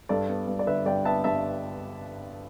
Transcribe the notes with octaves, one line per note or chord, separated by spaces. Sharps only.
G2 A4 D5
B3
G2
D5
D3 B4 E5
G2 D5 G5
B3 E5 A5
G2 E5 A5